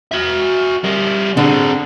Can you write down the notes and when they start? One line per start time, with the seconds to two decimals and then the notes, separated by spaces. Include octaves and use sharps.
0.12 F#4 E5
0.84 G3 A#4
1.37 D3 C4 G#4